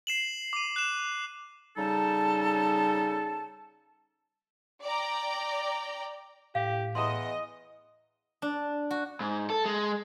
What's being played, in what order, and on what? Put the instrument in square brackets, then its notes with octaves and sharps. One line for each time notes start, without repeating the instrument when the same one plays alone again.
[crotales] C7 E7 F#7
D6 D#7
F#6 E7
[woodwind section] C#3 G3 D#4 A4 A5
[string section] D5 G5 A#5
[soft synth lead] A2 [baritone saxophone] G4 [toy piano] F5
[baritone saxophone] E2 [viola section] D#5 [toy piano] A#5 C6
[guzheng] D4
F#4
[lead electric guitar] G#2
A4
G#3